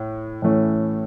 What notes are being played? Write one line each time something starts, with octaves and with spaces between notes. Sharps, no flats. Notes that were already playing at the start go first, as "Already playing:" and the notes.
Already playing: A2
A2 E3 A3 C#4